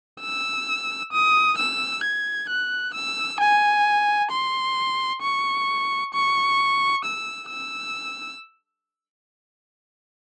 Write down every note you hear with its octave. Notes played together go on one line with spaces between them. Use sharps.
E6
D#6
E6
G#6
F#6
E6
G#5
C6
C#6
C#6
E6
E6